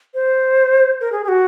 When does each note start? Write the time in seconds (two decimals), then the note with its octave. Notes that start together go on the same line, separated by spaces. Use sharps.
0.14 C5
1.00 A#4
1.12 G#4
1.24 G#4
1.28 F#4